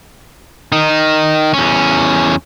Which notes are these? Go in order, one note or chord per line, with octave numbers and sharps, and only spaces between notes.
D#3 D#4
E2 C#4